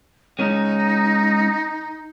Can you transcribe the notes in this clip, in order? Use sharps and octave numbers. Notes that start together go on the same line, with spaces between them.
G#3 C#4 D#4